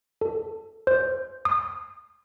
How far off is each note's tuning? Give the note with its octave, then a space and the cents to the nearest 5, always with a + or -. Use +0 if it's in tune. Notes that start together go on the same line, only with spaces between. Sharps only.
A4 +15
C5 +0
D#6 -25